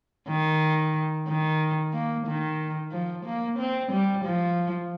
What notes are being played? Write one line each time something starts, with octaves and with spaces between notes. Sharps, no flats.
D#3
D#3
A#3
D#3
F3
A#3
C4
G3
F3